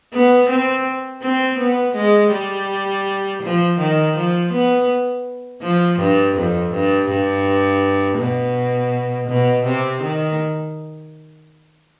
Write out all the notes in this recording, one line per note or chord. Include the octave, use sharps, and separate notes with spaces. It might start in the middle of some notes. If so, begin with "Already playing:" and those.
B3
C4
C4
B3
G#3
G3
F3
D#3
F3
B3
F3
G2
F2
G2
G2
B2
B2
C3
D#3